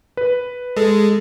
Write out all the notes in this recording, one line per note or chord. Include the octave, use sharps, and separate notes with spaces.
B4
G#3 A4